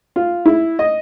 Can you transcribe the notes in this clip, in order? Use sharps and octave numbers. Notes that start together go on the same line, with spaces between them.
F4
E4
D#5